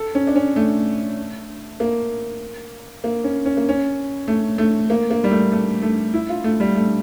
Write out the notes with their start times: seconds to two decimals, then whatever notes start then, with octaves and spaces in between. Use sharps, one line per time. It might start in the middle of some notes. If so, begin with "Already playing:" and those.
Already playing: A4
0.15 C#4
0.27 D4
0.36 C#4
0.56 A3
1.80 A#3
3.04 A#3
3.24 C#4
3.45 C#4
3.57 A#3
3.69 C#4
4.28 A3
4.58 A3
4.90 A#3
5.10 A#3
5.24 G3
5.31 A3
5.52 A3
5.82 A3
6.14 E4
6.29 F4
6.44 A3
6.60 G3
6.75 A3